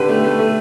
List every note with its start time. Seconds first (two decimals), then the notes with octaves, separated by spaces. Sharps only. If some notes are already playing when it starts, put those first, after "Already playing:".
Already playing: D3 G4 B4
0.09 A3
0.24 A3
0.39 A3